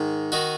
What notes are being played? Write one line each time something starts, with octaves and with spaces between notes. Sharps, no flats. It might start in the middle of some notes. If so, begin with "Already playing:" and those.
Already playing: G#2 D#3
D#3 D#4 F#4